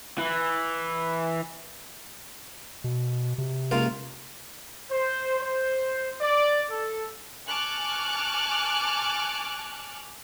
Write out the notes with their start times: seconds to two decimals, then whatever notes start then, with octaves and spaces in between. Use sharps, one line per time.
0.18 E3
2.84 B2
3.38 C3
3.71 C#2 A#3 F4
4.90 C5
5.38 C5
6.20 D5
6.69 A4
7.48 G#5 A5 C#6 D6 F6 F#6